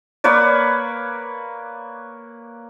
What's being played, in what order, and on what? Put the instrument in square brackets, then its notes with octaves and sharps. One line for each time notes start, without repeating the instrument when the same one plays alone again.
[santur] A#3 B4 C#5 D5